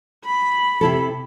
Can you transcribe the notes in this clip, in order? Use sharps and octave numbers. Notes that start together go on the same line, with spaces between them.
B5
C3 E4 A4